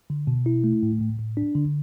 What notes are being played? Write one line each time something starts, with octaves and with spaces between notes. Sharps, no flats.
D3
B2
E4
A3
A2
A2
A2
D4
D3